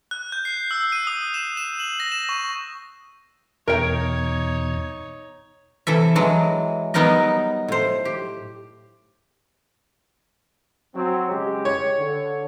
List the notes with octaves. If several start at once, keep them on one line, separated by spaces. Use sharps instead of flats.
F#6
G6
C7
E6
D#7
D#6
E7
E7
F#7
A#6
E7
C#6
E2 B2 D#4 A#4 C#5 G5 G#6
C3 E3 A4 E5
E3 F#3 G#3
F#3 G3 B3 D#4 A#4 D#5
A2 C5
G4
F#3 C4
C#3 G#3 G4
C#5
D3